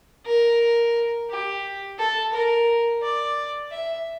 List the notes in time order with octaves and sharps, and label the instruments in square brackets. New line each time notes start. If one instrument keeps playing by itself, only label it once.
[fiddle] A#4
G4
A4
A#4
D5
E5